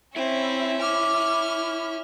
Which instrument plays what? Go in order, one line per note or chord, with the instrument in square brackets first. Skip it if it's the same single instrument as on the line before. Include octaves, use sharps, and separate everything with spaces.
[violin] C4 [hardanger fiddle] C#4 E5 [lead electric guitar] E4
[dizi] D6 [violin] F6